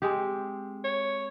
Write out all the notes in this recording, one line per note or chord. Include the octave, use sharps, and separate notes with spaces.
G#3 C4 G4
C#5